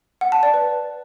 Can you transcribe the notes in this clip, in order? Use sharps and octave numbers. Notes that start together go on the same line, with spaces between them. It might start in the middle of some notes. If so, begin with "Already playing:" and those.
F#5
A5
D5
B4